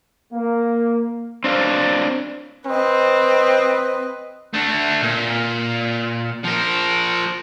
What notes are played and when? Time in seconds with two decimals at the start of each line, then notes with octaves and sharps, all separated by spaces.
0.33 A#3
1.44 C4 D4 F5
2.67 C4 B4 D#5
4.54 A3 D4
5.02 A#2
6.44 F3 A#4